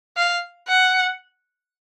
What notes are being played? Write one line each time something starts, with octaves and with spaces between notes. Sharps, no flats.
F5
F#5